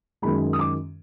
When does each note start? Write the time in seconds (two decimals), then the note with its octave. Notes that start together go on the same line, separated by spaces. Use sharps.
0.22 F#2 D#3 G#3 B5
0.53 D#6
0.59 D6